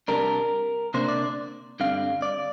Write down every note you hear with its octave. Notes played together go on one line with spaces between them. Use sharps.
C3 G3 D4 A#4
C3 A#3 D4 C5
D5
G2 D3 G3 C4 F5
D5